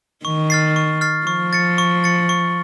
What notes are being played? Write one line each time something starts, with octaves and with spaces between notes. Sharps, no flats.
D#3 C#6
F6 A6 C7
C#6
F6 A6 C7
F3 C#6
A6 C#7
C#6
A6 C#7
C#6